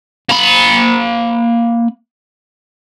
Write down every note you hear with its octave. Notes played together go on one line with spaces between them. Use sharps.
A#3 B5